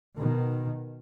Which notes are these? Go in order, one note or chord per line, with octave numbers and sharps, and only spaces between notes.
B2 D#3